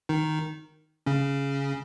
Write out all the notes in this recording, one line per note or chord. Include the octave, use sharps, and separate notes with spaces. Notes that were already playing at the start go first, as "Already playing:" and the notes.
D#3 D#4
C#3 C#4